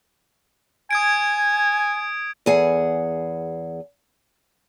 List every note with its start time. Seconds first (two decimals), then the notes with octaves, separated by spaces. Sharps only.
0.91 G#5 D#6 G#6 D7
2.46 E2 G#4 F#5